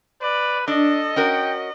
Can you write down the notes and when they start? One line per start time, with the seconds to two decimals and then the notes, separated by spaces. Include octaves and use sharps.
0.22 B4 D5
0.68 D4 A4 D#5
1.16 C#4 F#4 A#4 G5